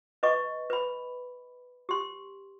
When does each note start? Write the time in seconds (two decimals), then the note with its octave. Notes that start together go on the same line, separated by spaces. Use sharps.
0.23 B4 D#5 C#6
0.70 B4 B5
1.89 G4 C6